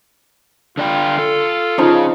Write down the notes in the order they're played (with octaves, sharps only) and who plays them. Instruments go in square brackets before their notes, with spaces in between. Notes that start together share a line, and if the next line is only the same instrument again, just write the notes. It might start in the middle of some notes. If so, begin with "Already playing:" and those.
[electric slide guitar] D3 D5 G5 [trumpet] F4
[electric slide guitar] A4
[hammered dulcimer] F3 D#4 [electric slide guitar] C#4 G#4